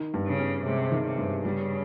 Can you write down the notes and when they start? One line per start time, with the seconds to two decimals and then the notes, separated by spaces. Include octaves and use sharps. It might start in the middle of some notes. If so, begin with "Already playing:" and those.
Already playing: D#3
0.14 G2
0.26 C#3
0.39 C#4
0.65 C3 G#3
0.92 D#3
1.05 C3
1.18 G2
1.45 C#3 G3